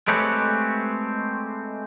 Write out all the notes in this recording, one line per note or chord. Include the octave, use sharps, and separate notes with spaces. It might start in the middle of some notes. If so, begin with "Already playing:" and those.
G#3 A3 C4 G4 B4 C#5